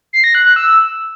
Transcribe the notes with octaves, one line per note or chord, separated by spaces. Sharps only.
C7
A#6
F#6
F#6
E6